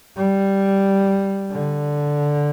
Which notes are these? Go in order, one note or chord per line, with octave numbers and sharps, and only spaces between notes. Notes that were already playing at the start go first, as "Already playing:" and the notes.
G3
D3